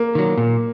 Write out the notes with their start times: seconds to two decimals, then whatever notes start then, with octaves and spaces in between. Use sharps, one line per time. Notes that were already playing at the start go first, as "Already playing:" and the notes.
Already playing: A#3
0.15 D#3 F#3
0.38 A#2